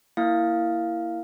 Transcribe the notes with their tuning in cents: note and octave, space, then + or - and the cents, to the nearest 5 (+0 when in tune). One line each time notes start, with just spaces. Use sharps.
A#3 +0 E4 +5 F5 +0